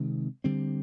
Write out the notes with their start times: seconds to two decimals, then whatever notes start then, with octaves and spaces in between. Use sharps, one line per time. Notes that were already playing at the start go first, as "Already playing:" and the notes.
Already playing: C3 D#3 G#3 C4
0.44 D3 G3 C4